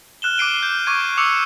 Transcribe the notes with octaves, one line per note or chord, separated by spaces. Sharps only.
F6 F#6 E7 G7
D6 F#6 C7 D7 D#7 G7
G6
C#6 D6 G#6 D#7
D7
C#6 D6 E6 C#7 F7